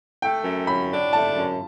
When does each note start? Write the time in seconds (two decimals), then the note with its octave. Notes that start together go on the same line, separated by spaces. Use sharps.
0.22 A3 G5
0.44 F#2
0.67 F#3 B5
0.90 D4
1.13 A3 A5
1.36 F#2